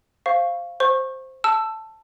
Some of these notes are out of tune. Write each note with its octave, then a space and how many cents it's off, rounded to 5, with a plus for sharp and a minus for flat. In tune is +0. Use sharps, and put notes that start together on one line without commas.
C5 +0 F5 -5 C#6 +0
C5 +0 C#6 -20
A5 +0 E6 +15